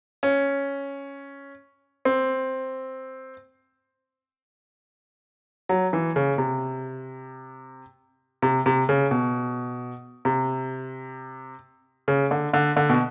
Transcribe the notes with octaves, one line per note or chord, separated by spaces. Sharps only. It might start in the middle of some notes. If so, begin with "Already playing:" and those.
C#4
C4
F#3
E3
C#3
C3
C3
C3
C#3
B2
C3
C#3
D3
D3
D3
B2